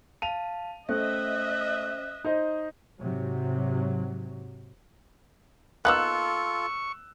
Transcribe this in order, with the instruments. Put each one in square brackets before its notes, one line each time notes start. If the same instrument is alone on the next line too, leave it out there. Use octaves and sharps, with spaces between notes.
[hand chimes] F5 A5 [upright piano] D#7 F7
[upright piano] A3 [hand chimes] C#4 C5 [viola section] D#5 E5 [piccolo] F#6
[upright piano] D#4 C5 D#5
[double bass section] G#2 C3 F#3
[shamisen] A#3 B3 D#4 [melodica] F4 A4 [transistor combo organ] C#6 [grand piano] E6 F#6